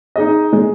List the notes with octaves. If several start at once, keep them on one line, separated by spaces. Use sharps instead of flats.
D#4 G#4 D#5
G#3